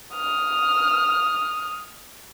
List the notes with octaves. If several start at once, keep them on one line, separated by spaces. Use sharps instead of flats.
D#6 F6